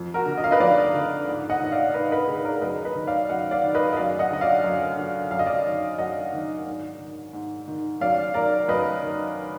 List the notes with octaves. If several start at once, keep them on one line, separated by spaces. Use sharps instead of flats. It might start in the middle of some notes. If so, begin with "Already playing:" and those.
Already playing: F2
F#4 A#4
D3
D#5
F5
B4 D#5
F2 D5 F5
D3
G#2
D#5 F#5
D#3 D#5
D5 F5
G#2 B4 D#5
B4 D#5
D#3 G#4 B4
A#4 D5
F#2 B4 D#5
B4 D#5
D#3
D5 F5
F#2 D#5 F#5
D5 F5
D#3
B4 D#5
D#5
F#2 D5 F5
D#5 F#5
D3 D#5
D5 F5
F#2
D3
F#2 F5
D#5
D5 F5
D#3
F#2 D#5 F#5
D#3
G#2
D#3
G#2
D#3
F#2 D5 F5
D#3 A#4 D5
F#2 B4 D#5
D#3